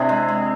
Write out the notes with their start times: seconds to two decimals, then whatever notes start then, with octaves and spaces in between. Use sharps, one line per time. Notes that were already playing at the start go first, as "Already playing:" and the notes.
Already playing: C3 C4 D4 E4 G#4
0.09 G#3
0.28 G#3